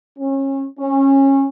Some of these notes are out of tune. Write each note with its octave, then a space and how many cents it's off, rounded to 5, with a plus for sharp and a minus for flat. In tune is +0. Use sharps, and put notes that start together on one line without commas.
C#4 -30
C#4 -20